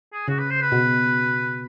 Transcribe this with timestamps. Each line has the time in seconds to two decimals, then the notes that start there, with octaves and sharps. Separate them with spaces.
0.13 G#4
0.28 C#3 F#4
0.39 B4
0.50 C5
0.61 B4
0.72 B2